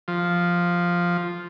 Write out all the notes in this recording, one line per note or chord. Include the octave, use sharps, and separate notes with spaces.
F3